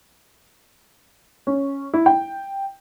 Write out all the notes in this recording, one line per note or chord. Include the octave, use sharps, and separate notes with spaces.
C#4
E4
G5